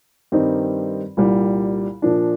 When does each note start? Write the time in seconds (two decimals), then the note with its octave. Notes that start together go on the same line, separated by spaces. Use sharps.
0.32 G2 D#3 G3 C4 D#4
1.17 C2 A#2 G3
2.02 A#2 F3 A#3 D4